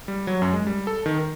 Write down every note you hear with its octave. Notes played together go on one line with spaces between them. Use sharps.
G3
F#3
F#2
G#3
G3
A4
D#3
A#4